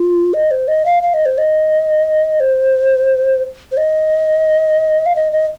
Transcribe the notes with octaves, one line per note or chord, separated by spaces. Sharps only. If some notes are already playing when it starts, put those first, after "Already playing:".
Already playing: F4
D#5
C5
D#5
F5
F5
D#5
C5
D#5
C5
C5
D#5
F5
D#5
D#5